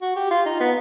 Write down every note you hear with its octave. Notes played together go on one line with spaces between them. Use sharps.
F#4
G4
F4
D#4
B3